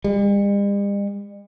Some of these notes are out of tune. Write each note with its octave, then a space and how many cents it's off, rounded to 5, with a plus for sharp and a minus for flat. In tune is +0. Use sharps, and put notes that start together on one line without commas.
G3 +45